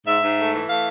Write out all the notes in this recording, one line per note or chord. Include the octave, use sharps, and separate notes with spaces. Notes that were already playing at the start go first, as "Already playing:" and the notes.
G#2 E5
G#2
A3
E3
A3 F5